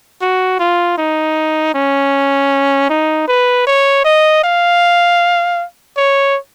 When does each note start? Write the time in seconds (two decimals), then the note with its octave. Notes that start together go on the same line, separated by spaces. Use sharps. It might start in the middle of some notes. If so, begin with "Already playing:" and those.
0.22 F#4
0.59 F4
0.98 D#4
1.75 C#4
2.90 D#4
3.28 B4
3.67 C#5
4.05 D#5
4.44 F5
5.97 C#5